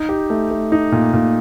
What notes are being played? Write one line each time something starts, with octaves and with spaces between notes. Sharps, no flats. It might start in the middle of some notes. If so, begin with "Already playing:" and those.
Already playing: D#4
G4
A3
A3
D#4
A#2
A#2